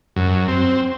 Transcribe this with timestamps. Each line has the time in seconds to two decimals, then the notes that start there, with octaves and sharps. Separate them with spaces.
0.16 F#2
0.48 C4